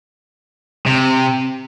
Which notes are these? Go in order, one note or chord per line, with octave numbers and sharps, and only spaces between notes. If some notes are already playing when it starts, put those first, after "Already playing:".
C3